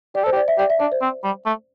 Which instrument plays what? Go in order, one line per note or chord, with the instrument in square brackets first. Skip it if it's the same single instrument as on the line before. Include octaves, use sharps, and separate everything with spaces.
[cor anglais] G4 [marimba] D5
[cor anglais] A4 [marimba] C5
[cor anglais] G4
[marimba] D5
E5
[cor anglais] G4 [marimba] D5
[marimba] E5
[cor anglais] D4 [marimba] D5
[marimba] C5
[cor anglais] C4
G3
A3